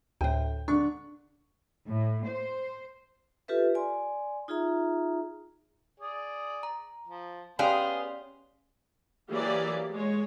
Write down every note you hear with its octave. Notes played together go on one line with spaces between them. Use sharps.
D2 A2 G5
D3 D4 C#6
A2
C5
F4 G4 A4 B4 E5
D5 G#5 C6
D#4 F4 G#4 E5 A#5
G#4 D5
A#5
F3
B3 C#4 G4 G#4 C#5 D5 F5 C6
E3 F#3 A#3 G4 G#4 D5
G#3 C#5